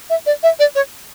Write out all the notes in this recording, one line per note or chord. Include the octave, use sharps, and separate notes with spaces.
E5
D5
E5
D5
C#5